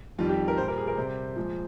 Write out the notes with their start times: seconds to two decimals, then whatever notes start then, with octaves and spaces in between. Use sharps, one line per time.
0.19 F2 D#3 G3 F4
0.29 G4
0.48 A#4
0.58 A#2 G3 C5
0.68 A#4
0.78 G#4
0.87 A#4
0.97 C3 G3 C5
1.36 A#2 F3 G#3